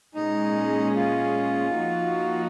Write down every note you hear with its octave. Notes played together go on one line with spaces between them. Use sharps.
A#2 G#3 C#4 D#4 G#4
F4
F3 A#3 D#4 F#4